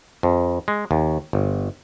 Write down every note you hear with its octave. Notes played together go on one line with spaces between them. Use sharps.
F2
G#3
D#2
G1